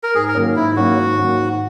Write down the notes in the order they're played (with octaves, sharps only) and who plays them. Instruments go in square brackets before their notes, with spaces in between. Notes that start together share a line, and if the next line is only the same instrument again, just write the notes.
[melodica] A#4
[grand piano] G#2 [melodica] G#4
[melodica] A#4
[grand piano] D#3 F#3 A#3 C#4
[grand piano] G#2 [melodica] E4
[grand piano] D#3 F#3 A#3 C#4 [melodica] F#4
[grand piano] G#2
D#3 F#3 A#3 C#4
G#2